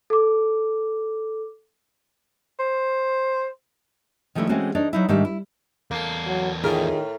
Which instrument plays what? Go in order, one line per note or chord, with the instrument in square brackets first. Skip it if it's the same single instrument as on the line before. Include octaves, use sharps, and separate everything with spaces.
[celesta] A4 D6
[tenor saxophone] C5
[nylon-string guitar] D#3 F3 G#3 A3 D4 E4
E3 G#3 A3 C4 C#4 F#4
D4 D#4 C#5 D5
F#3 D#4 E4
G#2 D#3 G3 D4 E5
E4
[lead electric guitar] E2 A4 [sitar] A#3
[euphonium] F#3
[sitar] A2 A#4 [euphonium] D#3 [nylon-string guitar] F4 G#4